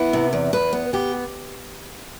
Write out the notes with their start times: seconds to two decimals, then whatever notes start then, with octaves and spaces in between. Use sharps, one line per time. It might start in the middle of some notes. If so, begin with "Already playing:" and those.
Already playing: B3 E4
0.13 C3
0.33 E2
0.53 E2 B4
0.73 B3
0.93 B3 G4